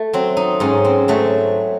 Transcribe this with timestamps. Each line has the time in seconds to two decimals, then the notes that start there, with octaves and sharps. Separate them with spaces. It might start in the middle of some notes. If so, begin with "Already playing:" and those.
Already playing: A3
0.13 F#3 C4
0.37 D#4
0.60 G#2 C#4
0.85 C4
1.08 F#3 A3